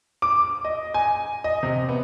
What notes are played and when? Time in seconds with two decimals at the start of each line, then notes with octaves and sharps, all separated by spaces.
0.22 D6
0.65 D#5
0.94 G#5
1.44 D#5
1.63 C3
1.89 B3